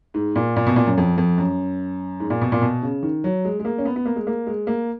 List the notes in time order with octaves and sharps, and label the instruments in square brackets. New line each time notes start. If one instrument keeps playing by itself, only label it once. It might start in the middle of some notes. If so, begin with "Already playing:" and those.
[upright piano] G#2
A#2
A#2
B2
A#2
F#2
F2
F2
F#2
G#2
A#2
B2
A#2
B2
C#3
D#3
F#3
G#3
G#3
A#3
C#4
B3
B3
A#3
G#3
A#3
G#3
A#3